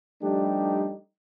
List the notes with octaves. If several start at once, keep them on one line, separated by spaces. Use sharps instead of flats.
F3 G3 A3 D4 D#4 G4